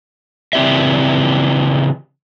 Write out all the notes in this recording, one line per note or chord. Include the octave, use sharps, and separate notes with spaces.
C#3 E3 C4 G4 D5 E5